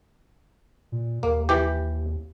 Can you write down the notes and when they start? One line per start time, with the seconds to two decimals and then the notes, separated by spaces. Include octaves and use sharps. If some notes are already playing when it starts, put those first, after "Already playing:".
0.92 A#2
1.23 D#2 A#3
1.49 E3 G4